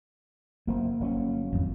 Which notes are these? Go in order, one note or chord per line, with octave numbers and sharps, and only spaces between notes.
F#1 F3 A#3
G1 F#3 C#4
G#1 F2